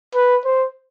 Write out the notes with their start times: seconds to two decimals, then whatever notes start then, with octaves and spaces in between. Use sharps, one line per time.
0.15 B4
0.45 C5